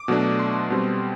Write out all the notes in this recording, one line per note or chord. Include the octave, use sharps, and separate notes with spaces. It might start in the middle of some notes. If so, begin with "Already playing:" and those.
Already playing: D6
B2 F#3 A3 D4
C6
B2 G3 C4